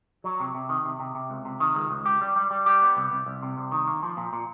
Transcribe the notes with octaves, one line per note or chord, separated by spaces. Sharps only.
F#3
C3
C3
D#3
C3
C3
C3
C#2
C3
D#3
C#2
C#2
G4
G3
G3
G3
G4
B3
C2
C2
C2
C3
C2
D#3
A#3
F3
A#2
A#2